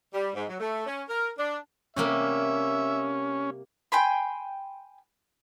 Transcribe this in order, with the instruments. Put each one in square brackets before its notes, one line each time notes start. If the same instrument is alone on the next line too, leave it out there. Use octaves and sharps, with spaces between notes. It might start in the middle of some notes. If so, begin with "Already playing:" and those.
[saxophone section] G3
G#2
F#3
A3
C#4
A#4
D4
[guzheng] C3 G3 A#3 [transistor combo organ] C#4 [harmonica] E5
[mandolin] G5 G#5 B5 C6